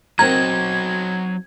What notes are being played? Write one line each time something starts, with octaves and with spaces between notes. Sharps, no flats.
F#3 C4 D#4 F#4 A#4 D#5 G#6